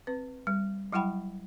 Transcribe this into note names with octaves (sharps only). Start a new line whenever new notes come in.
C4 B4
G3
F#3 G3 E4 F#5 G5 B5